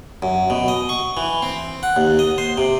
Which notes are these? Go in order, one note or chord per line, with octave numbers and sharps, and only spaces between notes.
F#2
B2
D#5
C#6
E3
C4
F#5
D#2
D#5
C5
C3